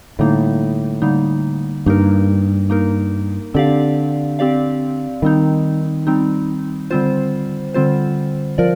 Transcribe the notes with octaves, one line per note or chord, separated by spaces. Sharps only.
A2 D3 G3 A#3 D#4
D3 G3 A#3 D#4
G2 A#3 D#4 A#4
A#3 D#4 A#4
D3 C4 G4 D5 F5
C4 G4 D5 F5
D#3 G3 C4 D#4
G3 C4 D#4
D3 G3 C4 F4 C5
D3 G3 C4 F4 C5
F3 A#4 D5